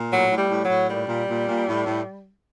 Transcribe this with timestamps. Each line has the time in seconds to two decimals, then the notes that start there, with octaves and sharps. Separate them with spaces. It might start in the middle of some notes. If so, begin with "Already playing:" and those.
Already playing: A#2
0.11 A2 F#3
0.31 A2
0.37 G3
0.50 A2
0.63 F#3
0.69 A2
0.90 A#2 G3
1.08 A#2
1.28 A#2
1.48 A#2
1.68 A2
1.87 A2